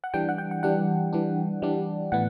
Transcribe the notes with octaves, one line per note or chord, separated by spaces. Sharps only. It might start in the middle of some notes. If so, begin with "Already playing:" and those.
F#5
E3 G3 D4 G5
F#5
G5
F#5
E3 G3 D4 F#5
E3 G3 D4
E3 G3 D4
A2 E3 B3 F#5